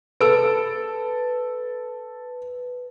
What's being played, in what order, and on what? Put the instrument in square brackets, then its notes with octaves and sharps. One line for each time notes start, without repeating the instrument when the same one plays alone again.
[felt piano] A4 E6 D7 [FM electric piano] B4